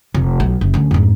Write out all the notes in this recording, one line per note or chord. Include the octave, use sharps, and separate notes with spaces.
F1
B1
F#1
D2 C#4
F2 G#2